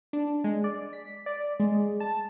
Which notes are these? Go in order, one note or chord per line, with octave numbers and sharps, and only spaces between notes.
D4
G#3
D5
B6
D5
G#3
A5